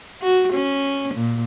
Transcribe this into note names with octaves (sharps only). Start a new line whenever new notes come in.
F#4
C#4
A#2